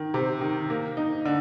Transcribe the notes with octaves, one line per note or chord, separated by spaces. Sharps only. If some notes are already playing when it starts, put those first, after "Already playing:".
Already playing: D#3
C3
D#3
A#3
D#4
D3